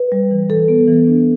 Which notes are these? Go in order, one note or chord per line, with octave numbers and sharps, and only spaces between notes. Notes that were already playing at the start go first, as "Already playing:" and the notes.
Already playing: B4
G3
E3
E3 A4
B3
E3
D4